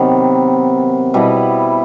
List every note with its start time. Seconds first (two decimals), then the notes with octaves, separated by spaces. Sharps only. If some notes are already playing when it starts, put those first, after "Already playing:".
Already playing: C3 D#3 F#3 B3
1.14 B2 G3 B3 E4